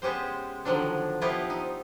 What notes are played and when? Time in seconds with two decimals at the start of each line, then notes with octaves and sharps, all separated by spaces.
0.02 G#3 B3 C#4 G4 C5
0.65 D3 D#3 F3 F#3 D4
1.21 F3 B3 E4 F4 G4
1.50 D#4